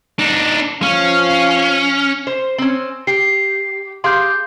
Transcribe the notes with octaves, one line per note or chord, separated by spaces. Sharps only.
D4 D#4
F3 C#4 F5
C5
C4 C#4
G4 C7
G4 G#4 F5 C6 G6